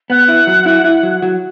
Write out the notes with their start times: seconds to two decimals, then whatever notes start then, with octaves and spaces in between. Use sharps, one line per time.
0.09 B3 F#5
0.28 E4
0.47 F#3
0.66 E4
0.84 E4
1.03 F#3
1.22 F#3